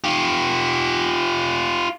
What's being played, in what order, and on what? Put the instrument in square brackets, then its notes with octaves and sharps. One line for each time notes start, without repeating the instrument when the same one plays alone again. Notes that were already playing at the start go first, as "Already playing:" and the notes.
[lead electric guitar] F4 G4